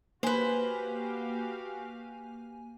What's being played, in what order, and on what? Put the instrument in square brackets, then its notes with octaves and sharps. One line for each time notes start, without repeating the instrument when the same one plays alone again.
[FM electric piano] A#3 G#5 [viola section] F#4 G4 F5 [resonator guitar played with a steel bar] B4 C5